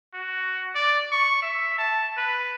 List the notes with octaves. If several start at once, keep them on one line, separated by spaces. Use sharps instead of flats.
F#4
D5
C#6
E5
A5
B4